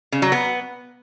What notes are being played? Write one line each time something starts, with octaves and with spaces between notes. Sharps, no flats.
C#3
F#3
B3